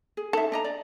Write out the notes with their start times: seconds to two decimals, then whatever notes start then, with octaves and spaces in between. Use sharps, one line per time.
0.17 G#4
0.33 D#4 A4 E5
0.52 D4 D#5 A#5
0.64 D5